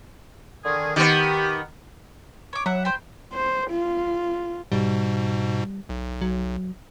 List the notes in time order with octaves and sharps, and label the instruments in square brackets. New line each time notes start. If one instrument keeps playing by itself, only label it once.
[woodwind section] D3 D#3 G#4
[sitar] D#3 B3 [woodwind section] G4
[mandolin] C#5 D6
[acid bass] F#3 [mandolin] E5 F#5
[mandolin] C5 G5
[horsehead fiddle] C5
F4
[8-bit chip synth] G#2 B2 [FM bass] G3
[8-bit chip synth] B1
[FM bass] F#3